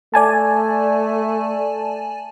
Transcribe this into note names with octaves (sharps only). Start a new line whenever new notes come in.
A3 D5 G#5 A5